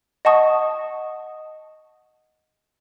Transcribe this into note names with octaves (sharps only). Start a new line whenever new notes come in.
D#5 F#5 A5 C#6 D#6